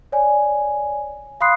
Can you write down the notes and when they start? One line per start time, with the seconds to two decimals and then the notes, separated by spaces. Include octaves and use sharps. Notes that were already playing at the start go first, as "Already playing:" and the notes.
0.12 C#5 D5 G#5
1.41 F5 B5 C6 D#6 F#6 C7